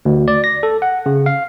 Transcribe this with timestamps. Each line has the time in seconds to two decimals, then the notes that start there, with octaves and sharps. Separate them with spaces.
0.05 D2
0.28 D5
0.44 A#6
0.63 A4
0.82 F#5
1.06 C#3
1.26 F5